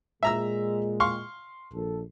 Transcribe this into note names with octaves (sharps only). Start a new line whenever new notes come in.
A#2 G#3 E5 A#5 E6
F5 C6 C#6
A#1 A4